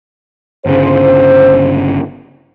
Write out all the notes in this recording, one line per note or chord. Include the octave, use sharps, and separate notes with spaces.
G1 C#3 C5